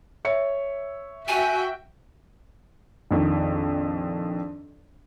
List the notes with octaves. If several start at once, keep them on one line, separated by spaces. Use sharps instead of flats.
C#5 E5 C#7
F#4 E5 G5 G#5
A#1 F2 D#3